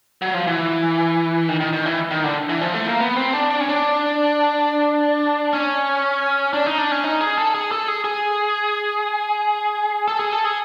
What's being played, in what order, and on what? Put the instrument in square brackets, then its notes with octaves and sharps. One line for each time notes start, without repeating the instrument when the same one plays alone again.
[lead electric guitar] F#3
F3
E3
D#3
D#3
D#3
E3
D#3
D3
E3
F3
A3
A#3
B3
C4
D4
D4
C#4
D4
C#4
D4
D#4
D4
C#4
D#4
G#4
A4
G#4
A4
G#4
G#4
A4
G#4
A4
G#4